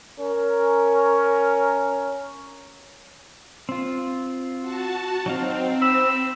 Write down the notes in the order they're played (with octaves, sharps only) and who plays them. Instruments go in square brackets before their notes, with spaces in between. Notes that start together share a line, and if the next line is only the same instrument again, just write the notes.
[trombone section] C#4 A#4
[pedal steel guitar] C4 F4
[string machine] F#4 A5
[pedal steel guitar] F#3 D#4 F5 [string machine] C4
[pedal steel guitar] B5 [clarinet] E6